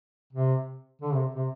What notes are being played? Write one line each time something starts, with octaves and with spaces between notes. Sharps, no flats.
C3
D3
C3
C3